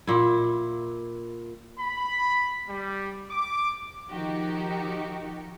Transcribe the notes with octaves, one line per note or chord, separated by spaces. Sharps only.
A#2 E4
B5
G3
D6
D#3 F3 D#4 F#4 G4